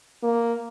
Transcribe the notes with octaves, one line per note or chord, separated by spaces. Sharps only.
A#3